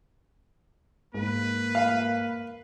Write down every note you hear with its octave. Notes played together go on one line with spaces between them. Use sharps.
G#2 A#3 B4
F5